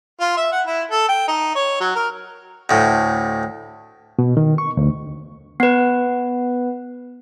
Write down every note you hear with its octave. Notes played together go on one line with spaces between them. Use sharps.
F4
E5
F#5
E4
A4
G5
D#4
C#5
F#3
A#4
D2 A2
B2
D#3
C#6
D2
B3 B4